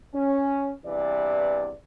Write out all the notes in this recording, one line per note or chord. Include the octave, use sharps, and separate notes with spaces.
C#4
E2 G2 C3 E3 D5